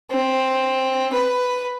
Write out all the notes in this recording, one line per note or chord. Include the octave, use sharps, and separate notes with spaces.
C4
B4